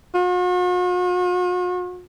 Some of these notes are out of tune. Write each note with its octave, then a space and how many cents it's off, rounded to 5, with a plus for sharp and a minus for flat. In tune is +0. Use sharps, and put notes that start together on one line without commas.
F#4 -45